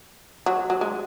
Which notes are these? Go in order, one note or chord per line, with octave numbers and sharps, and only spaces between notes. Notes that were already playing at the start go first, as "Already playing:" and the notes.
F#3
F#3
G#3